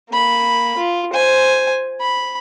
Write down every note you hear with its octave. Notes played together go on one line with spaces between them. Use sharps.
A#3 B5
F4
C5 G#5
B5